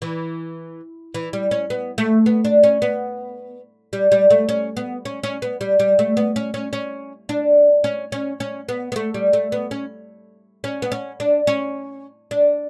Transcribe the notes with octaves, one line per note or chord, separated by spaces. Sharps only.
E3
E3
G3
C#4
B3
A3
B3
D4
C#4
B3
G3
G3
A3
C#4
B3
C#4
C#4
B3
G3
G3
A3
B3
C#4
C#4
C#4
D4
C#4
C#4
C#4
B3
B3
A3
G3
A3
B3
C#4
C#4
B3
C#4
D4
C#4
D4